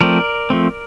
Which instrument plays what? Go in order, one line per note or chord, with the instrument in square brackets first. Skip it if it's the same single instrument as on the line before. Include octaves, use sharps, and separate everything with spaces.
[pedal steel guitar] F3 A3 C4 A#4 D5
F3 A3 C4